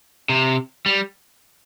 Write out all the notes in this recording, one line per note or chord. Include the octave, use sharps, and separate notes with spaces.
C3
G3